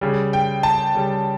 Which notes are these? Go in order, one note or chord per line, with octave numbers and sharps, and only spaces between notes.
C#3 G3
G5
A5
C#3 G3